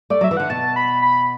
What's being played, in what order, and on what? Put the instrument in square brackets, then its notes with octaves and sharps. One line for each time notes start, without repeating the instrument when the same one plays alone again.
[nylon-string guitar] A3 [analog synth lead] D5
[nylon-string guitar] F#3 [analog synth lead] E5
[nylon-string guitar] E3
[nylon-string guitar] D3 [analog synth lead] F#5
[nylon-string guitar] B2 [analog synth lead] A5
[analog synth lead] B5
B5